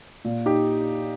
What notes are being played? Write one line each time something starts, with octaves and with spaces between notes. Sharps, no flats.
A#2
D#4 G4